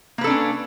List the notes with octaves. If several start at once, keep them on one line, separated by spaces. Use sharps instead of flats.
A#3 C#4 D4 A4 B4